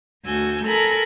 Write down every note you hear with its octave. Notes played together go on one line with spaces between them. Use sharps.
D2 F#4 G#5 E6 G6
A4 A#4 G#5 A#5 B5